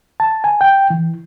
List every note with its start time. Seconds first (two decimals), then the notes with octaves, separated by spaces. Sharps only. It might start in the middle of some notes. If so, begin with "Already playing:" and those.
0.20 A5
0.44 G#5
0.61 G5
0.90 E3